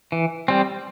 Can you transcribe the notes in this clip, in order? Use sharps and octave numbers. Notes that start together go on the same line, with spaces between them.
E3
G3 C4